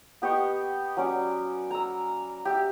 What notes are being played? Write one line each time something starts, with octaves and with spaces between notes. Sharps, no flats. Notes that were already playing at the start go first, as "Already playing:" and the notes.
B3 G4 D#5 C#6
F#3 C#4 D5
A#5 E6
G4 E5